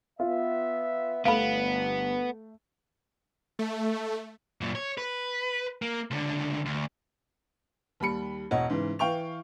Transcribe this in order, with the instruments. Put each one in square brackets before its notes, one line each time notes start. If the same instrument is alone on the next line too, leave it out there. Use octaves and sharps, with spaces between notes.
[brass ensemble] B3 E5 [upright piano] F4
[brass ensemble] G1 [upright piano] A3 D7 [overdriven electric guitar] B3 [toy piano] F5 B5
[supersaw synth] A3
[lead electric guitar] F#2 A#2
C#5
B4
A#3
C#2 D3
D2
[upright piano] D#2 G3 B5 C#7
E1 C#5 D#5 F#5
G#2 C#3 E3
E3 F5 G5 C#6 F7